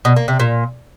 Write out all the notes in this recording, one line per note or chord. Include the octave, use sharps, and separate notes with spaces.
B2
A#3
C3
A#2